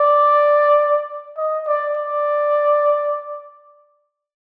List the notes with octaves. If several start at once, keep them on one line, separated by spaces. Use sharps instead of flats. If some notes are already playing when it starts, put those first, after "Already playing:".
Already playing: D5
D#5
D5
D5